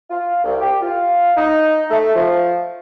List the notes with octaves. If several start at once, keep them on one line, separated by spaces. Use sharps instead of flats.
F4
C2
G4
F4
D#4
A3
F3